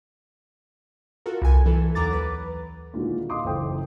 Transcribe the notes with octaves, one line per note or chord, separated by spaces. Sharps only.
F4 F#4 A4 A#4
C2 G#5
E3 A4
D#2 F#3 A#5 D6 A6
B4
A#2 D3 D#3 G#3 E4 F#4
D#5 F5 C6 D6 D#6
F#1 E3 A4 C5 G5 D#6